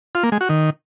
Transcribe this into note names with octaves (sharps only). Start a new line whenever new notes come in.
F4
A#3
G#3
F#4
D#3